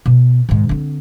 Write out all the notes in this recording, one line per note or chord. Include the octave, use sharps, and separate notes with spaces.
B2
G#2 D#3
D3 C4